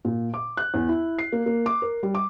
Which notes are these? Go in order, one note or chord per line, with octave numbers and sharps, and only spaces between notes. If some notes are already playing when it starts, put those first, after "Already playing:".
A#2
D6
F#6
E2
E4
C7
A#3
A#3
D6
A#4
G3
D6